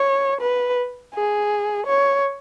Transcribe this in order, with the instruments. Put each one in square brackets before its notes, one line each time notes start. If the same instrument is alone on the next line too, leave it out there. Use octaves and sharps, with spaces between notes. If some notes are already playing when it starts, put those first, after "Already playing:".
Already playing: [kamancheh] C#5
B4
G#4
C#5